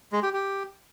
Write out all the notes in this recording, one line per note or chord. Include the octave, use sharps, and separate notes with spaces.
G#3
G4
G4